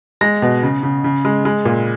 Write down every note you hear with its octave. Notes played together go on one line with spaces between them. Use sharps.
G#3 A#6
B2
C#3
C#3
C#3
G#3
G#3
A#2